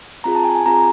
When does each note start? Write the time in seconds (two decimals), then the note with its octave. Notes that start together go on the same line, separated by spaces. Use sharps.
0.24 C4 F4 G#4 A#5
0.35 A5
0.44 G#5
0.55 G#5
0.66 C4 F4 G#4 A#5